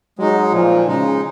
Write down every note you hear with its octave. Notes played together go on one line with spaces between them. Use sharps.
F#3 G#3 D#4
A#2 F3
C#3 G#3 D#4